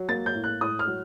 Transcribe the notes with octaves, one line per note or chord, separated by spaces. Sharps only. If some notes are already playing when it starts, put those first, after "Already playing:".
Already playing: F#3
A#3 A6
G6
A2
F#6
A2 D#6
F6
F#3